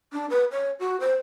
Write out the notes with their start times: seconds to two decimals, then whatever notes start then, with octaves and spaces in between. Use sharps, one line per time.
0.13 D4
0.30 B4
0.51 C#5
0.79 F#4
1.00 C5